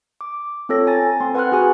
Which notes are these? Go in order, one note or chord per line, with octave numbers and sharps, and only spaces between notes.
D6
C4 F4 A4 C#5 A#6
G#5 A#5 A6
C4 C6
B4 F#5 G#5 C6 F6 F#6
F#4 G#4 G#5